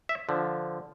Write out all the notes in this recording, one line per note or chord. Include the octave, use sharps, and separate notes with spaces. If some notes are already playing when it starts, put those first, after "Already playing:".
E5
D3 F3